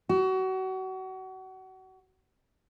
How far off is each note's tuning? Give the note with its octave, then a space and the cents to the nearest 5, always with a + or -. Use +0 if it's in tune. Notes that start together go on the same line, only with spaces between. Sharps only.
F#4 +30